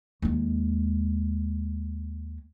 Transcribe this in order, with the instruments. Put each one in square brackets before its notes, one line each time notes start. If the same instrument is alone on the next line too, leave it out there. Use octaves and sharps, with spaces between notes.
[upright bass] D#2 G#3